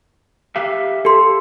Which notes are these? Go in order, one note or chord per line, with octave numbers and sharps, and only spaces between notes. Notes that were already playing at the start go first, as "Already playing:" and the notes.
G4 E5 F5
G4 A4 C6